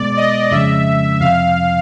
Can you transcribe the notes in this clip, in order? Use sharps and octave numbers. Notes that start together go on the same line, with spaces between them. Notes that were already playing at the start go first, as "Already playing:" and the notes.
Already playing: B2 G#3 B3 D5
D#5
F2 C#3 F3 G#3 C#4 E5
F2 C3 F3 F5